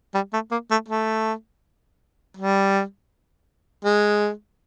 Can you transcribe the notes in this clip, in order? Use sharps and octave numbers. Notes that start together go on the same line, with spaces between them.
G3
A3
A#3
A3
A3
G3
G#3